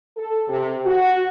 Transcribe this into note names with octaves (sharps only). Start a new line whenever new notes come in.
A4
C3
F#4